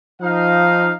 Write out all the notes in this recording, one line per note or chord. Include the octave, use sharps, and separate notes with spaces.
F3 D#4 F5